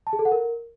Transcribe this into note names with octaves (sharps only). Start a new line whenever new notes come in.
A5
G#4
A4
F#5
A#4